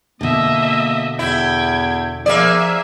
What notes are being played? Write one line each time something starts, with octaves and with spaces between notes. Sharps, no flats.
B2 D3 A#3 D#5 E5
E2 E4 G5 G#6
F3 A#3 G#4 D5 E5